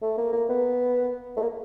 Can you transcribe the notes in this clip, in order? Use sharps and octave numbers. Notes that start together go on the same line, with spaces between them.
A3
A#3
A#3
B3
A3
A#3